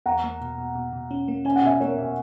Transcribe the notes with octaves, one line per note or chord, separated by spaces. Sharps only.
E2 F#5 A#5
A#3
B2
B2
B2
B2
C#4
A#3
C#4 G#5
F#5
B2 E5 G#5
A#3 A#4 C#5
B2